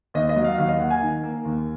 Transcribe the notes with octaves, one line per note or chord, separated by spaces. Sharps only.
D#2 D#5
D#5
F#3
F5
D#2 F5
D#5
A#3 F#5
G#5
D#3
A#3
D#2